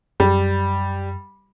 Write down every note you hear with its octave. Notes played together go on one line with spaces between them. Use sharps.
F#2 G3